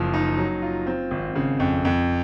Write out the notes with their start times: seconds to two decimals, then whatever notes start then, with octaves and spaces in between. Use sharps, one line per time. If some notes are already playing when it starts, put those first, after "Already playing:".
Already playing: F#1 F3
0.13 D#4
0.38 F#3
0.62 F4
0.87 C4
1.11 G#1
1.35 C#3
1.60 F2
1.85 F2